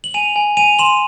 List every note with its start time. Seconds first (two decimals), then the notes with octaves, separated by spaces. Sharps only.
0.04 F#7
0.14 G#5 D#7 F7
0.36 G#5
0.57 G#5 D#7 F7
0.79 C6 E7 F#7